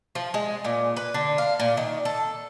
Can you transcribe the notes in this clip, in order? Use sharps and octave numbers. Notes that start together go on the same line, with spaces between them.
F3
G#3
A#2
B4
D3
F5
A#2
D#3
A4